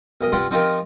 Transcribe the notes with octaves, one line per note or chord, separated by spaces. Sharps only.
B1 A#4 D#5
G2 C3 F4 G4 F#5 C6
F3 C4 D#4 F4 G4 A#4